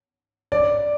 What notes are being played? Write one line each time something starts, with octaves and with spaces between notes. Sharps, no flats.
D5